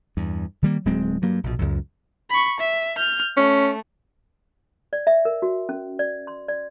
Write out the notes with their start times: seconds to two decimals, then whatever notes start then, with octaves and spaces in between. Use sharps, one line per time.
0.17 E2 G2
0.62 D#3 G3 A#3
0.85 D1 F#3 G#3 C4
1.22 G2 F#3 A#3
1.44 A#1 B2
1.59 C#2 F#2
2.30 B5 C#6
2.60 E5
2.97 F6 G6
3.37 A3 C#4
4.93 D5
5.07 E5
5.25 A#4
5.42 F#4
5.69 C#4
5.99 D5
6.27 C6
6.48 D5